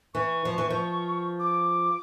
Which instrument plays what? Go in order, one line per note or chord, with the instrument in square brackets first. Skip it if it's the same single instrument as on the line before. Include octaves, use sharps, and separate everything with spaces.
[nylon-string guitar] E3 [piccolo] C#6
[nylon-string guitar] F3
E3
F3
[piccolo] D6